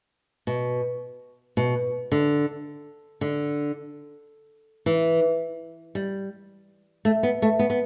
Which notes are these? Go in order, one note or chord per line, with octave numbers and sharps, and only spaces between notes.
B2
B2
D3
D3
E3
G3
A3
B3
A3
B3
B3